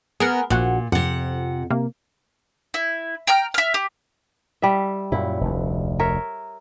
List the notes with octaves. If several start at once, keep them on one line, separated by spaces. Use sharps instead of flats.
B3 G#4 A#4 F#5
A#1 A#2 F#4 F#5
F2 C3 F#5
C3 A#3
E4
G5 A#5 F6
E5 F6
G4
G3 E5
F#2 A#2 E4
F1 D2
A#4 C#5 E5